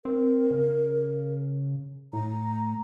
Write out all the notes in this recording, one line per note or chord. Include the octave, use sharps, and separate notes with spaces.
C4 A#4
C#3
A2 A#5